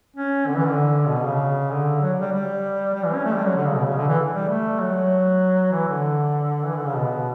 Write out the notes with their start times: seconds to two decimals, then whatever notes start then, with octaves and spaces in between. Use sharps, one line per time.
0.16 C#4
0.47 D3
0.56 E3
0.67 D3
1.08 B2
1.24 C#3
1.70 D3
2.02 F#3
2.21 G3
2.32 G3
2.94 G3
3.05 E3
3.14 C#4
3.24 A3
3.35 G3
3.45 F#3
3.55 D3
3.66 C#3
3.76 B2
3.87 C#3
3.97 D3
4.08 E3
4.34 G3
4.49 A3
4.80 F#3
5.72 E3
5.88 D3
6.65 E3
6.75 D3
6.85 C#3
6.95 B2